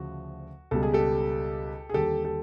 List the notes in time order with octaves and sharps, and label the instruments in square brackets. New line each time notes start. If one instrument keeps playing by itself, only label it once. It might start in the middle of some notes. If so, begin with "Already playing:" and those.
Already playing: [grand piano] D2 C#3 F3 F#4
C#2 B2 G3 A4
G#4
G4 A4
G#4
D#2 D3 G3 G4 A4
G4 A4